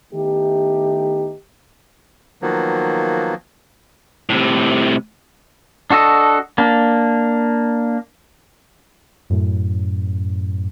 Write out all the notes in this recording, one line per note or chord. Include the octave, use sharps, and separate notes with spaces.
D#3 A3 B3 D#4 E4 G4
D#3 F3 F#3 A#3 B3
A2 C3
D4 F#4 A4 D#5
A#3 D4
F#2 A2